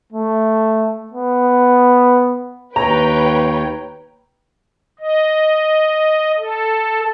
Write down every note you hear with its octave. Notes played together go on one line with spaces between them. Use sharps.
A3
B3
D#2 B4 C#5 G5 A#5
D#5
A4